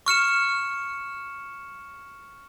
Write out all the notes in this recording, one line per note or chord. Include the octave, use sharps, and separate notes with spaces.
C#6 F6 C#7 E7